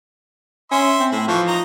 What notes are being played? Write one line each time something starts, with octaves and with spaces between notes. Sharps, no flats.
C#4 E5 C6
C4
A2 E4
E3 F3 C#6
D#4 A#5